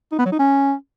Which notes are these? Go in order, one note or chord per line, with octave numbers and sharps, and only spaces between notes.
D#4
B3
F#3
D#4
C#4